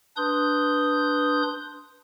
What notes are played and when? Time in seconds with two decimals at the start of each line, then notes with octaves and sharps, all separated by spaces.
0.17 D4 B4 C6 D#6 G6